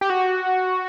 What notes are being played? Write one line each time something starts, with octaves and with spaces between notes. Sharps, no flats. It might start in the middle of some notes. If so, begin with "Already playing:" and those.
G4
F#4